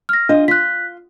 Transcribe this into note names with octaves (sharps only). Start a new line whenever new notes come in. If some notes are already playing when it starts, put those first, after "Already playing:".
F6 A#6
D4 F4 D#5
F4 F#6 B6